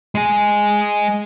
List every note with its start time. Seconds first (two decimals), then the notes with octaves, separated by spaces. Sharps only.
0.15 G#3 G#4